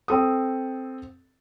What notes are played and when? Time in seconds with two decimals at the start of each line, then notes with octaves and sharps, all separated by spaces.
0.08 C4 A4 D#6